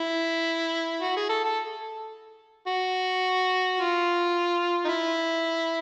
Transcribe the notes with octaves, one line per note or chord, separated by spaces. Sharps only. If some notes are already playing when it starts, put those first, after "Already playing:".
Already playing: E4
F#4
G#4
A4
A4
F#4
F4
D#4
E4